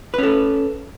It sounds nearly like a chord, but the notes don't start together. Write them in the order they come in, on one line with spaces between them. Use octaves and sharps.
B4 C#4 A4